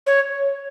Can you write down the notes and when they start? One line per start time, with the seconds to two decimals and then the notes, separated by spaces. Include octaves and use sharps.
0.07 C#5